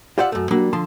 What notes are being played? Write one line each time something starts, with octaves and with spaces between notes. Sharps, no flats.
F4 G4 C5 D5 E5 F#5
F#2 A3
F#3 G3 A#3 D4
D3 F3 A5 C6